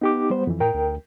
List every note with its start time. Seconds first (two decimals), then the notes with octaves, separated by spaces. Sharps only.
0.01 B3 D#4 G4 D6
0.30 G3 C5
0.47 F2 E3
0.60 A2 A#4 G5
0.74 D2